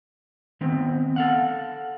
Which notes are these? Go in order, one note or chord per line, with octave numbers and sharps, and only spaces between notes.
D#3 B3 C4
A4 F5 F#5